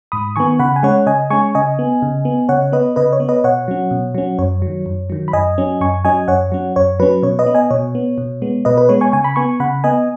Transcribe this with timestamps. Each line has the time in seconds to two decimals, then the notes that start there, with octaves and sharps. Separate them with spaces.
0.12 G#2 B5 D#6
0.36 D#3 B3 G#5 C#6
0.59 C#3 F#5 B5
0.76 G#5
0.83 G#3 C#4 C#5 F#5
1.07 C#3 D#5 G#5
1.30 G#3 C#4 G#5 C#6
1.55 C#3 D#5 G#5
1.79 B3
2.02 C#3
2.25 B3
2.49 C#3 C#5 F#5
2.72 B3 B4 D#5
2.96 C#3 B4 D#5
3.13 C#5
3.20 B3
3.29 B4 D#5
3.44 B2 C#5 F#5
3.68 F#3 C#4
3.91 B2
4.15 F#3 C#4
4.39 F#2 C#5
4.62 F#3
4.67 D#3
4.86 F#2
5.10 D#3 F#3
5.28 B5
5.33 F#2 D#5 G#5
5.58 F#3 C#4
5.81 F#2 G#5 C#6
6.05 F#3 C#4 D#5 G#5
6.28 F#2 C#5 F#5
6.52 F#3 C#4
6.76 F#2 C#5
6.99 F#3 C#4 B4
7.23 B2 C#5
7.39 B4 D#5
7.46 B3
7.55 D#5 G#5
7.71 B2 C#5
7.95 B3
8.18 B2
8.42 G#3 B3
8.65 B2 B4 D#5
8.78 B4
8.89 G#3 B3 C#5
9.01 G#5 C#6
9.12 C#3 G#5 C#6
9.24 B5
9.36 B3 G#5 C#6
9.60 C#3 F#5 B5
9.84 B3 D#5 G#5